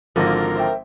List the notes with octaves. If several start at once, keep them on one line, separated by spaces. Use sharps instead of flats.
G#1 D3 F3 A#3 A#4
C5 E5 G5